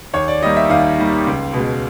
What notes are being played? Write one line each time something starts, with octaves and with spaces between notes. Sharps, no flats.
D#2 C#5
D5
D#3 G3 A#3 D#5
E5
D#2 F5
D#3 G3 A#3
C#2
B2 G#3